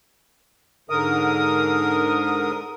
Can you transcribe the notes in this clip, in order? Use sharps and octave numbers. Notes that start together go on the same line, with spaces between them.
G#2 D3 A#4 D#6